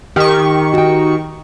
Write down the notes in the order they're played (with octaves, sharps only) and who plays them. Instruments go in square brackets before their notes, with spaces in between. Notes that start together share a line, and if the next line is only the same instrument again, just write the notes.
[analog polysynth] D#3 C#6 [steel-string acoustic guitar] G4
[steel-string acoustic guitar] F#4 G5